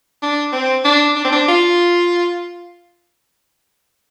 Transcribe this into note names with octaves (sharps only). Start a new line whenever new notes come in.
D4
C4
D4
D4
C4
D4
F4